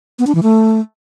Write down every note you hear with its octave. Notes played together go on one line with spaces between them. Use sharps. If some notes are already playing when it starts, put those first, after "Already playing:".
B3
D4
E3
A3